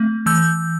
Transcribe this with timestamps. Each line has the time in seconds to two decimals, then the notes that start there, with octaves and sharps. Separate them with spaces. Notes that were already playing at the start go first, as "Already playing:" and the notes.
Already playing: A3 C4
0.26 E3 E6 G6